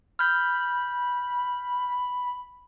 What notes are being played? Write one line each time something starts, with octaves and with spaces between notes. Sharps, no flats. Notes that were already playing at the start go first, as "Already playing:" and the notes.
B5 F6 G6